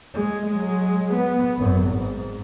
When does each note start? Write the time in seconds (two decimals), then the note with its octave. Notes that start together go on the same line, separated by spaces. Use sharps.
0.14 G#3
0.47 F#3 G#3
1.14 B3
1.57 G#1 F#2
1.87 G#2